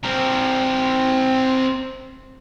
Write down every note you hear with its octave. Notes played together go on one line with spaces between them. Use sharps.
C4 A#4